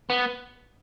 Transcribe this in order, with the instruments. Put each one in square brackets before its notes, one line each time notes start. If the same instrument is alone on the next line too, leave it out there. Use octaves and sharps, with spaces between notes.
[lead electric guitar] B3